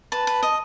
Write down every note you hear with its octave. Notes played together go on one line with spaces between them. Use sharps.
B4 A5
B4
D#5